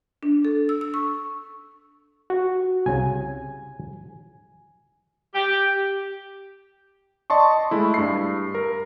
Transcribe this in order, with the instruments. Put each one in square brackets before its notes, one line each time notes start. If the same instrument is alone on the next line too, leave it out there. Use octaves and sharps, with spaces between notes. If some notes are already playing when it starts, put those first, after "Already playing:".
[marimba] D4
A4
E6
E6
C#6
[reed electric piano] F#4
[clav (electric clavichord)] C2 C#3 [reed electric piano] G#5
[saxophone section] G4
[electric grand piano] D5 D#5 A5 C6 C#6
G#3 A3 E4
G2 C7
A#4